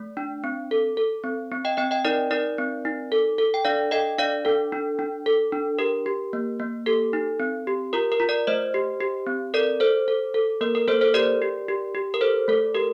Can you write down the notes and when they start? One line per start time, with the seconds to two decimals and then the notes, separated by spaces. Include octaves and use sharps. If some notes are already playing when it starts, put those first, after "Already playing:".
Already playing: A3
0.17 D4
0.44 C4
0.71 A4
0.97 A4
1.24 C4
1.52 C4
1.65 D#5 G5
1.77 C4 D#5 G5
1.91 D#5 G5
2.05 D#4 A#4 D5
2.31 D#4 A#4 D5
2.58 C4
2.85 D#4
3.12 A4
3.38 A4
3.54 G5
3.65 D4 D5 F5
3.91 A4 D#5 G5
4.18 D4 D5 F5
4.45 D4 A4
4.72 D4
4.99 D4
5.26 A4
5.52 D4
5.79 G4 A#4
6.06 G4
6.33 A#3
6.59 A#3
6.86 G4 A4
7.13 D#4
7.40 C4
7.67 G4
7.93 F4 A#4
8.12 A#4
8.20 F4
8.29 A#4 D5
8.47 A3 C5 D#5
8.74 G4
9.00 G4
9.27 C4
9.54 A4 A#4 D5
9.80 A4 C5
10.08 A4
10.34 A4
10.61 A#3 A#4
10.75 A#4
10.88 A#3 A4 C5
11.01 A4 C5
11.14 G4 A#4 D5
11.42 G4
11.69 G4
11.95 G4
12.14 A#4
12.21 A4 C5
12.48 A3 A4
12.75 G4 A#4